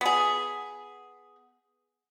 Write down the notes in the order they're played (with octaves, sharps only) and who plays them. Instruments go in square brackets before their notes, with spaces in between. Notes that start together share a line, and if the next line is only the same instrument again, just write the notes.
[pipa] B3 G#4